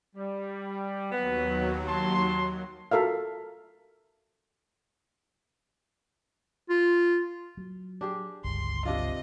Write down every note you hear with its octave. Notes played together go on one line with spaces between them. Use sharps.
G3
D#2 F#3 B3 B4
A5 C6
F4 F#4 A4 A#4 E5 F5
F4
F#3
D4 G4 G#4
G1 C#2 G2 C6
C3 D4 F4 D#5